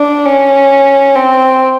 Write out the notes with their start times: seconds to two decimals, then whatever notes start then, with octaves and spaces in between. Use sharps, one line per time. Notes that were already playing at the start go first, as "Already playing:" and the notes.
Already playing: D4
0.25 C#4
1.15 C4